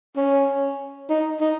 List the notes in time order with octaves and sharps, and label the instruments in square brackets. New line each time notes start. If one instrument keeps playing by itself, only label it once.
[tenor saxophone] C#4
D#4
D#4